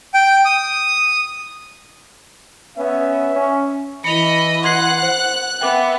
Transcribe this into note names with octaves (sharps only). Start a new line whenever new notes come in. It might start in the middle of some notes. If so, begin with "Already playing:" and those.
G5
D#6
B3 C#4 E5
C#4
E3 D#5 B5 C#7 F7
F#5 C6 F#6 G#6 C7
C5
B3 E5 G5 D6